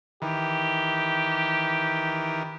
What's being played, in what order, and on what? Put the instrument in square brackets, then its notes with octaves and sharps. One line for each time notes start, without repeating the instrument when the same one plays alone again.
[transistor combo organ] D#3 E3 [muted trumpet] G4